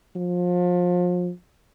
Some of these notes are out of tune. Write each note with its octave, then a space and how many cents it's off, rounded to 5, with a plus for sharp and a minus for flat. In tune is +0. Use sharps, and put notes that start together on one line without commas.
F3 +30